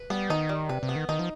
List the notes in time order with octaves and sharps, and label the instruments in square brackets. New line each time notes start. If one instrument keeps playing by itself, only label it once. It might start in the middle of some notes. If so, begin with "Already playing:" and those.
Already playing: [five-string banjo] B4
[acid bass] G3 [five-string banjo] B3
[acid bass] D#3 [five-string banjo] D#4
[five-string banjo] G3
[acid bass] C3 [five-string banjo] B4
[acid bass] C3
[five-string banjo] B3
[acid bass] D#3
[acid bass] D#3 [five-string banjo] D#4
[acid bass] F3